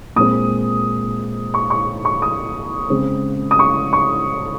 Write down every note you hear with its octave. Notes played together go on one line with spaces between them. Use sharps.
A#2 G#3 C4 D#6
C#6
C#6
C#6
D#6
C#3 G#3 C4
D#6
C#6
C#6